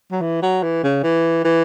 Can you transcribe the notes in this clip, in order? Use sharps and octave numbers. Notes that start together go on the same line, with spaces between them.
F#3
E3
F#3
E3
C#3
E3
E3